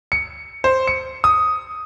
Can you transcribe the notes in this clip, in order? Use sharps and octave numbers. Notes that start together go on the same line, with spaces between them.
C#7
C5
C#7
D#6